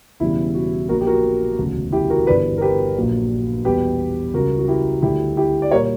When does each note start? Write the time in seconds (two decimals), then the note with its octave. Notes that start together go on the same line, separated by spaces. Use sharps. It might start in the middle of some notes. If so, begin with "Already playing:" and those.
0.20 E1 E2 C#3 G3 E4
0.55 F#4
0.89 A#1 A#2 F#3 F#4 A#4
1.01 G4
1.07 F#4 A#4
1.59 E1 D2 C#3 F#3
1.92 E4 G4
2.10 F#4 A#4
2.27 G1 G2 E3 G3 B4 D5
2.58 A#4
2.61 G4 B4
2.96 A#1 A#2 F#3
3.65 E2 B2 G3 G4 B4
4.34 C#2 C#3 G3 F#4 A#4
4.59 F#4
4.68 E4 G4
5.02 D2 D3 G3 E4 G4
5.37 E4 G4
5.62 D5
5.71 A#2 G3 A#4 C#5